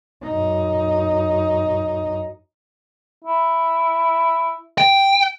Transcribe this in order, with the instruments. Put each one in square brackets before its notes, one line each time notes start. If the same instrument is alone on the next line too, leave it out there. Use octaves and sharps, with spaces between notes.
[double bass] F#2 D#4
[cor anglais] E4
[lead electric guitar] G5